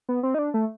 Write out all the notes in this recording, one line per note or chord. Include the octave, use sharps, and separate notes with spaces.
B3
C4
D#4
D4
A3